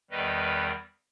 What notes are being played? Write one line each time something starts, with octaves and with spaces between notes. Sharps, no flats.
E2 D#3 G3 B4 D#5